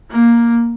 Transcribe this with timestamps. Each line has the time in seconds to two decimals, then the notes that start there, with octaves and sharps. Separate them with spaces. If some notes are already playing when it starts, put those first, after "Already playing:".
0.11 A#3